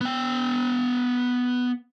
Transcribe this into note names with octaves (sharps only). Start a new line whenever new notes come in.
B3 G5